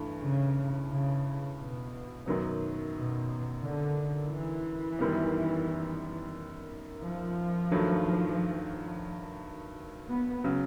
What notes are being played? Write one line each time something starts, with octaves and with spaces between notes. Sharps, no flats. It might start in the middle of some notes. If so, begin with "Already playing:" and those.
Already playing: G2 E3 A3
C#3
C#3
B2
F#2 D#3 F#3 B3
B2
D3
E3
F#2 D#3 G3 B3
F3
G2 D#3 F#3 A3
B3
C#3 F#3